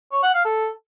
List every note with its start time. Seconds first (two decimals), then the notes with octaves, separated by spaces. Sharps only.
0.12 C#5
0.23 F#5
0.34 F5
0.45 A4